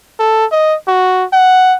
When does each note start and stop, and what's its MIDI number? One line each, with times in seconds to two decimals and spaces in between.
0.19 0.46 69
0.51 0.75 75
0.88 1.25 66
1.33 1.76 78